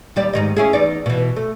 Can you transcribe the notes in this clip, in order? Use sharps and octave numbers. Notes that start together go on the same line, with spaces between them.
D#2 G3 D5
G#2 D#3 D#5
C#4 E4 G#4
E2 D#4 D5
B2 E3
A3